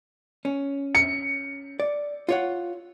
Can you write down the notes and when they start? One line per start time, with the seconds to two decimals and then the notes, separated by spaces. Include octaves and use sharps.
0.45 C#4
0.95 C#7
1.80 D5
2.29 F4 C#5 F#5